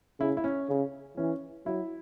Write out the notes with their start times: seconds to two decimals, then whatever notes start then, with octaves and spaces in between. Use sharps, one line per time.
0.20 C#3 E4
0.37 E4
0.44 C#4
0.69 C#3
1.17 E3 C#4
1.66 F#3 E4